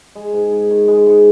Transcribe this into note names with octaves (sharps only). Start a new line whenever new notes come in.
G#3
G#2
G#2
D#3
G#3
G#2